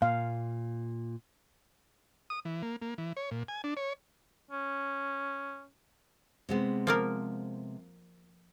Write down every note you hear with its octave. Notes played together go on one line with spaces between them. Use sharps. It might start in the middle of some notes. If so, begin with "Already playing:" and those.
A#2 F5
D#6
E3
A#3
A#3
E3
C#5
A#2
G#5
D4
C#5
C#4
C3 G#3 B3
F3 A#3 A#4